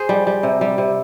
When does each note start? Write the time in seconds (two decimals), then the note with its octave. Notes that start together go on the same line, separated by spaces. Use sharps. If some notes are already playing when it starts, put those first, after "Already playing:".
Already playing: G#4 C5
0.09 G3
0.27 G3
0.43 C3
0.61 G3
0.78 C3